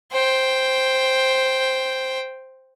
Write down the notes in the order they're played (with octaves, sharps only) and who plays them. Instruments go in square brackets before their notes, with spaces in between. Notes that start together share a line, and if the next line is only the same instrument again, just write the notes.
[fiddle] C5 G5